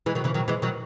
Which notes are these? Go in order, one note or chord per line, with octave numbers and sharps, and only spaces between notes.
E3 G#3
D#3 F#3
C#3 E3
D#3 F#3
E3 G#3
D#3 F#3